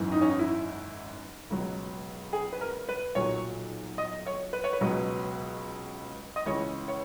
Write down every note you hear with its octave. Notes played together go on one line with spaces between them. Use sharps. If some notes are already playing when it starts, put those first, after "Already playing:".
Already playing: G#1 F#2 E3
D#4
C#4
D#4
E4
C#2 B2 F#3
G#4
B4
A#4
B4
B1 A#2 F#3 C#5
D#5
C#5
B4
C#5
B4
C#2 B2 F#3
D#5
C#2 C#3 E3 C#5
C#5